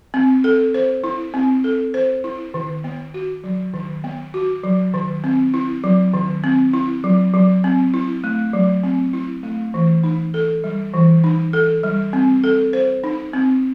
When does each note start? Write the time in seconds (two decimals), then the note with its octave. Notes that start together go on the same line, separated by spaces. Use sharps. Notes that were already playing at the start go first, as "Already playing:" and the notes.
0.14 C4
0.44 A4
0.74 C5
1.04 E4
1.34 C4
1.64 A4
1.94 C5
2.24 E4
2.54 D#3
2.84 B3
3.14 F#4
3.44 F#3
3.74 D#3
4.04 B3
4.34 F#4
4.64 F#3
4.94 D#3
5.24 C4
5.54 E4
5.84 F#3
6.14 D#3
6.44 C4
6.74 E4
7.04 F#3
7.34 F#3
7.64 C4
7.94 E4
8.24 A3
8.53 F#3
8.84 C4
9.13 E4
9.43 A3
9.74 E3
10.04 D#4
10.34 A4
10.64 G3
10.94 E3
11.24 D#4
11.53 A4
11.83 G3
12.13 C4
12.44 A4
12.73 C5
13.04 D#4
13.33 C4